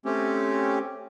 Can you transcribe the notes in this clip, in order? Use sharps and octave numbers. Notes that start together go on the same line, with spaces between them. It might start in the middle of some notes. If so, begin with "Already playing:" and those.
A3 C4 C#4 G4